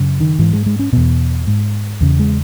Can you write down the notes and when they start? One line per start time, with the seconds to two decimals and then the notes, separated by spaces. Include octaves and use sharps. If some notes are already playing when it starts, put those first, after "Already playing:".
Already playing: F#2 C#3
0.20 D#3
0.39 G#2 E3
0.53 G#3
0.66 G#3
0.79 C#4
0.93 E2 B2 B3
1.47 G#2
2.01 E2 C#3
2.19 G#3